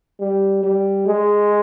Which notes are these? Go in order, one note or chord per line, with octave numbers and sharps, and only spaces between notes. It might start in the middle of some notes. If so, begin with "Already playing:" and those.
G3
G3
G#3